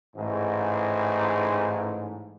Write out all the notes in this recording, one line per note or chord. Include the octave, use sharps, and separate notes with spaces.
A1 G#2